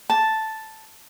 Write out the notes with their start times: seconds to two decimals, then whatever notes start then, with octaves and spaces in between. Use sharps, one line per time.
0.10 A5